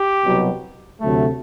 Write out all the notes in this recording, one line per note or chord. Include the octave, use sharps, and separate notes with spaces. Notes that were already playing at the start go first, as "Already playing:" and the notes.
Already playing: G4
C2 B2 F#3
D2 C3 F#3 A3